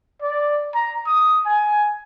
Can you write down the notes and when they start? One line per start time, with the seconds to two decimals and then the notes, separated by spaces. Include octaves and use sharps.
0.22 D5
0.75 A#5
1.06 D#6
1.45 G#5